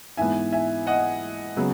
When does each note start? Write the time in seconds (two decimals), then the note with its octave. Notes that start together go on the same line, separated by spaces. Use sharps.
0.17 G#2 E3 B3 E5 G#5
0.52 E5 G#5
0.87 D#5 F#5
1.56 C#3 F#3 B3